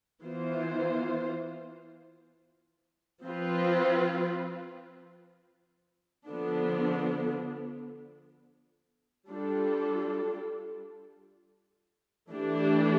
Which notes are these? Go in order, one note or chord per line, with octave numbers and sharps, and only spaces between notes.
E3 B3 F4 C5
F3 C4 F4 B4
D3 F3 B3 D4
G3 D4 F4 A4
E3 A3 D4 G4